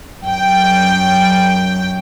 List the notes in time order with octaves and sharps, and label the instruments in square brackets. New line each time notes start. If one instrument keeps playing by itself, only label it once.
[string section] F#2 G5